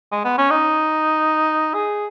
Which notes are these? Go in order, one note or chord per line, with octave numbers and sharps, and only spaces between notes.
G#3
B3
C#4
D#4
G#4